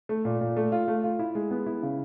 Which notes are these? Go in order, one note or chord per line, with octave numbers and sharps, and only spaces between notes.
A3
A#2
A#2
A3
F4
A3
F4
E4
G#3
B3
E4
C#3